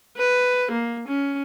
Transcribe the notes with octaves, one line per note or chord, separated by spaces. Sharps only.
B4
A#3
C#4